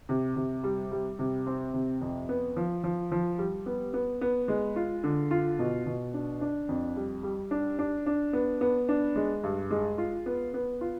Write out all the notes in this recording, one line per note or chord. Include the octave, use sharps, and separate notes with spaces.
C3
C3
G3
G3
C3
C4
C3
F2
B3
F3
F3
F3
G3
B3
B3
B3
G#3
F4
D3
F4
B2
B2
D4
D4
F2
G3
G3
D4
D4
D4
B3
B3
D4
G#3
G2
G#3
F4
B3
B3
F4